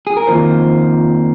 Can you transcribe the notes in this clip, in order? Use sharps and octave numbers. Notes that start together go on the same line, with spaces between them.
G#4
A#4
F2 D#3 A#3 F4 C5